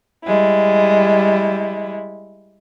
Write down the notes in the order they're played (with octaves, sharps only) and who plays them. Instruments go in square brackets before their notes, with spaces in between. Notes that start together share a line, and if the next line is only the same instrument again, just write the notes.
[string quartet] G3 G#3 E4